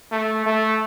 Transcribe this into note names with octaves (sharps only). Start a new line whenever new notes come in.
A3
A3